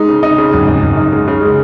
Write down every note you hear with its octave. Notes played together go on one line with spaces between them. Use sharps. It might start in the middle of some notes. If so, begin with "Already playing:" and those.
Already playing: G#3 D#4
C#3
D#4
C#3
F#2
F#2
F#2
D#4
G#3
C#3
G#3